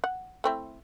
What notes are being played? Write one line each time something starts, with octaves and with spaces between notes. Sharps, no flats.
F#5
A3 C4 E4